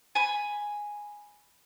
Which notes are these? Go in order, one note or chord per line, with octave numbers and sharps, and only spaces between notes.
G#5 B5